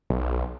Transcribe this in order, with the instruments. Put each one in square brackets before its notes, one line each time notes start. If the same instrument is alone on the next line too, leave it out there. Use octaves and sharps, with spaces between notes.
[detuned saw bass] B1